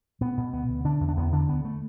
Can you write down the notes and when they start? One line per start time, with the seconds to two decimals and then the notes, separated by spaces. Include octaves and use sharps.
0.21 B2 B3
0.37 B2
0.53 D2 B3
0.69 D2
0.84 D3 D4
1.00 E2
1.09 D4
1.17 E2 B3
1.32 D3 D4
1.49 D2 B3
1.65 A3